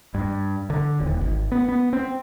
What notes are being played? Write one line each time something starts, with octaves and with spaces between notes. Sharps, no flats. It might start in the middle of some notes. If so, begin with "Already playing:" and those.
G2
D3
D#1
G#1
B3
B3
C4